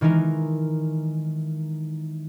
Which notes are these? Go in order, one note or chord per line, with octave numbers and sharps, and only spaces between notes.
D#3 E3 G#3 D#4 A#4